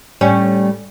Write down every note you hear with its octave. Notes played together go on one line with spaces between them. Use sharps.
A2 G3 C#4